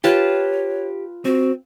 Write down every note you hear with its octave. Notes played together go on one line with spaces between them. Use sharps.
F4 G4 B4 C#5 A5
C4 F#4